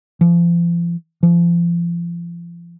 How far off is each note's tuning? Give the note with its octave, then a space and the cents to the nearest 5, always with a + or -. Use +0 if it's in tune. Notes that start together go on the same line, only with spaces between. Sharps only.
F3 -35
F3 -35